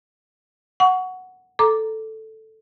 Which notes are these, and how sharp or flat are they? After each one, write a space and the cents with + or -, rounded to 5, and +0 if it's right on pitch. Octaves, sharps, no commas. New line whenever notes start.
F#5 +0 C#6 +25
A4 +0 A#5 +0 D6 +0